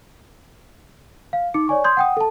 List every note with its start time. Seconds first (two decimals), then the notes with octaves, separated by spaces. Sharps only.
1.33 F5
1.54 D#4 D6 C#7
1.68 C#5 D5 G#5 C#6
1.84 C6 D#6 G6 G#6
1.97 F#5 G5 D#6
2.17 A4 A5